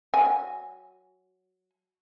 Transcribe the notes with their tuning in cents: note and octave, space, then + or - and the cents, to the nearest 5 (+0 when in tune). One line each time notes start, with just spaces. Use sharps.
F#3 +0 G#5 +0